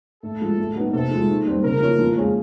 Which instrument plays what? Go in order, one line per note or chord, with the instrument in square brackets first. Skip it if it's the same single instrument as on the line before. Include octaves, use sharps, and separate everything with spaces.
[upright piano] A2 [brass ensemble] A4
[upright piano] F3 G#3
A2
F#3 B3 D#4
[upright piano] C3 [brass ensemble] A4
[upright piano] F3 G#3
D#3
G3 C4
[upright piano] C#3 [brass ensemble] A#4
[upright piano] F3 A#3 C#4 E4
F3
G#3 C#4 F4 G#4